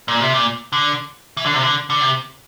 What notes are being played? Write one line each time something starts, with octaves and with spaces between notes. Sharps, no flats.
A#2
C3
A#2
D3
E3
D3
C3
D3
D3
C3